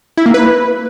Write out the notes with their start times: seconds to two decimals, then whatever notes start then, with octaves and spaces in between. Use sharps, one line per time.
0.17 E4
0.26 A#3
0.34 B4